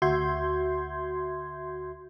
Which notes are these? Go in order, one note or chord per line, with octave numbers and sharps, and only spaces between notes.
D2 F#4 E5 C6 G6 G#6